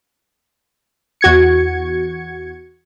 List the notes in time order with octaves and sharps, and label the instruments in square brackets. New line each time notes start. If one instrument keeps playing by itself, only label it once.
[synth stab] E2 F#4 G#6 C#7